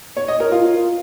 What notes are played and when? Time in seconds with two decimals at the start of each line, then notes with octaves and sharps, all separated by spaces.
0.17 C#5
0.28 D#5
0.40 A#4
0.52 F4